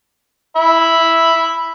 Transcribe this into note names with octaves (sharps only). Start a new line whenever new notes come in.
E5 B5